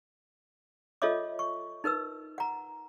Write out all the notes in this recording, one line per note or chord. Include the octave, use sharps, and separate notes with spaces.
F4 A4 C#5 D#5 E5 D6
C#6
D#4 A#4 B4 E6
F#5 A#5